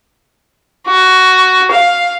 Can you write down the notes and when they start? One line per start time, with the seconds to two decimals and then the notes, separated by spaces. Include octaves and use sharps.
0.88 F#4
1.72 F5